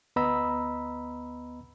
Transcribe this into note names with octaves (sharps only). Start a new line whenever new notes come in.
D2 B3 D#5 A#5 B5 E6